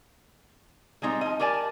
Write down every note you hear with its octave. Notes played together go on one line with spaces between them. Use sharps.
G3 G#3 C4 D#4
F3 D#5
G4 A#4 D5 G#5 A5